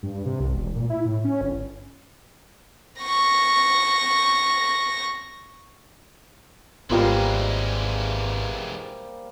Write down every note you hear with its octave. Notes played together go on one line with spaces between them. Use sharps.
G2
C3
C2
E1
A#2
E4
A2
C#4
G1
C#6 A#6
G#1 E3 G3 G#3 A#3 B3 F4 C5